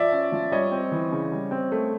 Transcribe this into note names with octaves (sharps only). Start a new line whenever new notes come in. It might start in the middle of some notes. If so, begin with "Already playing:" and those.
Already playing: F3 D5 E5
C#4
F3
G3 C#5 D#5
C4
E3
C#3
G3
C4
A3